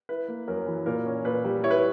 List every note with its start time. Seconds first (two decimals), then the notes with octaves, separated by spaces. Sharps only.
0.09 E4 B4
0.28 A#3
0.48 F#2 A#4
0.67 E3
0.86 A#2 A#4
1.06 C#4
1.25 A#2 B4
1.45 G3
1.63 E4 C#5
1.71 B4